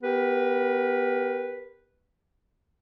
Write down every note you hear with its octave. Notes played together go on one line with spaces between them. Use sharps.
B3 G4 A#4 B4